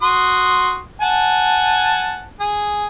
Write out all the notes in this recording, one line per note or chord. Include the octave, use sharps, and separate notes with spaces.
F#4 C6 D#6
F#5 G#5 A5
G#4